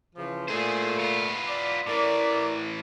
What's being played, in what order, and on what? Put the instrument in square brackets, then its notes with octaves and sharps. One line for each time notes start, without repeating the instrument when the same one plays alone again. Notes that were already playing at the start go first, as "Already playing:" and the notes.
[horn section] C#3 E3 F3
[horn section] A#2 A3 [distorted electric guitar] G#4 C5
[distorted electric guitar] B3 F4
[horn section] D5
[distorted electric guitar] A2 E3 [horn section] A#4 D5